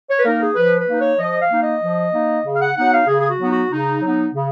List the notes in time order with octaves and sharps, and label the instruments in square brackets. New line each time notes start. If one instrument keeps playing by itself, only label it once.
[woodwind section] C#5
B4
A#3 D#4 A#4
G#4
F3 B4
B4
A#3 D#4
C#5
F3 D#5
F5
A#3 D#4
D#5
F3
A#3 D#4
C#3
F5
F#5
F#3 B3 D#4 F#5
F5
C#3 G#4
G#4
F#4
F#3 B3 D#4
F#4
C#3 D#4
F#3 B3 D#4
C#3